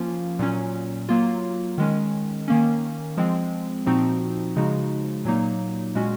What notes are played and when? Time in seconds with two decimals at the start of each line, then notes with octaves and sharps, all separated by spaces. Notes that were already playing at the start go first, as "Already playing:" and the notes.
Already playing: F3 A#3 C#4 F4
0.39 A#2 F#3 C#4
1.09 F#3 A#3 F4
1.78 D#3 G#3 C#4
2.48 D#3 A#3 C#4
3.17 F3 G#3 C4
3.86 A#2 F3 C4 D#4 F#4
4.56 C#3 F3 G#3 D#4 F#4
5.25 A#2 F#3 A#3 D#4
5.95 A#2 G#3 C#4 F#4